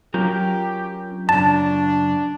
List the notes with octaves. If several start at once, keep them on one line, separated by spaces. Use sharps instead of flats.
F#3 C#4 F4 G4 A#4 A#5 G6
F#2 C#3 D4 A5